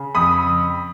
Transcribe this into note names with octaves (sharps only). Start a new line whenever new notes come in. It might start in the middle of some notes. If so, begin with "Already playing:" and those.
Already playing: C#3
F2 B5 D#6